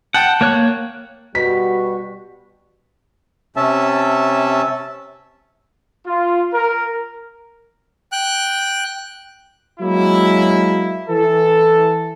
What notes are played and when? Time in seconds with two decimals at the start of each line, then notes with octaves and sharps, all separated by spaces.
0.14 F#5 G5 A5
0.41 A#3 C#5 F#6
1.35 B2 G3 F#4 B6
3.56 C3 C#4 E5 A5
6.05 F4
6.53 A#4
8.12 G5 F#6
9.80 F#3 G#3 A#3 E4
11.08 E3 A4